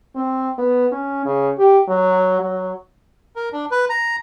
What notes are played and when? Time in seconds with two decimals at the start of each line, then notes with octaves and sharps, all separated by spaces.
0.15 C4
0.58 B3
0.92 C#4
1.25 C#3
1.59 G4
1.88 F#3
2.41 F#3
3.36 A#4
3.52 D4
3.71 B4
3.89 A#5